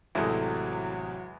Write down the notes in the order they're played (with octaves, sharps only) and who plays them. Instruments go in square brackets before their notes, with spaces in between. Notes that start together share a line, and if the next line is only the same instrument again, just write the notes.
[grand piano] A1 C3 D#6 [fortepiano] E2 G#3 [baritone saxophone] F#3 [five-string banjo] E4 A4